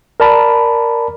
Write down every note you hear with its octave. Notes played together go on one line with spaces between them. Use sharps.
A#4 D5 A5 B5